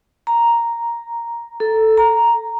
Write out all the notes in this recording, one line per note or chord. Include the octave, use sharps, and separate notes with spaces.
A#5
A4
A#5